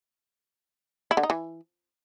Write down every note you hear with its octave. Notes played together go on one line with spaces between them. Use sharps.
E4
D3
D#4
E3